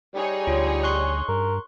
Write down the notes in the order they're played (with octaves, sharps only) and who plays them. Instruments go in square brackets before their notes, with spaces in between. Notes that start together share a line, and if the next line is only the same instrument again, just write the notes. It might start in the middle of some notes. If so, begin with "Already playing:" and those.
[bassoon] G3 [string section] D#4 G#4 C#5
[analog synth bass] D2 [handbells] F4
[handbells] C6 C#6 F#6
[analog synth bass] G2 [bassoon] A#4